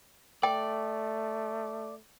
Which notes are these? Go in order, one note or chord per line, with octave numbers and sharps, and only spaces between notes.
A3 D5 G5